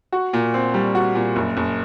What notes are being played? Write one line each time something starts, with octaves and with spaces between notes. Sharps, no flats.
F#4
A#2
C4
G3
F#4
A#2
F#1
F#1